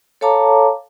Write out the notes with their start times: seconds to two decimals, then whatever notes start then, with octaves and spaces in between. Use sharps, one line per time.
0.21 A4 C#5 F5 A5 A#5 D6